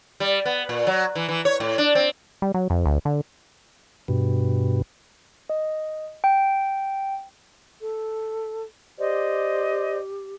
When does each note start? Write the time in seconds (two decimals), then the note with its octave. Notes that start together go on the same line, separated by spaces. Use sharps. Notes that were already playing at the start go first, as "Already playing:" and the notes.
0.20 G3
0.45 B3
0.69 A#2
0.87 F#3
1.15 E3
1.29 E3
1.45 C#5
1.60 A2
1.78 D4
1.95 C4
2.42 G3
2.54 F#3
2.70 F2
2.86 D2
3.05 D3
4.08 G2 B2
5.50 D#5
6.24 G5
7.81 A4
8.99 G4 C5 D5 D#5